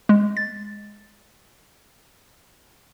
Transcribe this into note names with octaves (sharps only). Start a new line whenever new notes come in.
G#3
A6